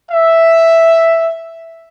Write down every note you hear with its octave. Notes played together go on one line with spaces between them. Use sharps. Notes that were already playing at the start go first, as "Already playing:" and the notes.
E5